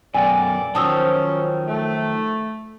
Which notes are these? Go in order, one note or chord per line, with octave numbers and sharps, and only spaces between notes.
F#2 B2 A4 D5 G5 G#5
D#3 F3 F#3 C#4 A5 D#6 E6
A3